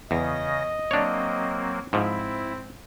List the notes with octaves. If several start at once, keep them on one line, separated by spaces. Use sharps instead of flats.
E2 C#3 D#5 A#6
F#3 A#3 C4 D4 C#5
G#2 F3 C4 E4